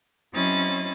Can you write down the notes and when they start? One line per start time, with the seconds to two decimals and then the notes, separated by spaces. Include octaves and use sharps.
0.33 F#3 C4 C#4 E4 D#5 A6